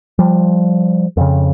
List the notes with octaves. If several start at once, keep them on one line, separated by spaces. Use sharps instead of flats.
F3 G3
F2 C#3